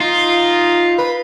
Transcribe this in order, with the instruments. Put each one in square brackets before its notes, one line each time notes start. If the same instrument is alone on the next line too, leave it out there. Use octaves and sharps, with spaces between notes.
[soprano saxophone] D#4 [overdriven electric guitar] F4
[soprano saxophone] B4